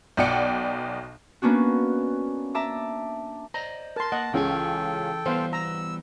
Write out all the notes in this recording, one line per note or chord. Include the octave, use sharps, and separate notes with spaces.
B1 B2 D5 F#5 G5 C#7
A#3 B3 C#4 D4 F#4
E5 A5 A#5 D6
C5 D5 D#5 A#5
A#4 A5 C6
A#3 D#5 F#5
C#2 E3 C#4 G#4 A4 C#5 G5
E3 G3 B3 C5 F5
A#5 E6